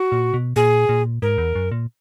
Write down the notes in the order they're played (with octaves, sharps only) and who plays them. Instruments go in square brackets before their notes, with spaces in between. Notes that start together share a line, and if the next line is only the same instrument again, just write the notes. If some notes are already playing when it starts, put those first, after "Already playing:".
Already playing: [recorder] F#4
[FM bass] A#2
B2
[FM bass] A#2 [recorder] G#4
[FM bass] A#2
[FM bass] G#2 [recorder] A#4
[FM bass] E2
F#2
A#2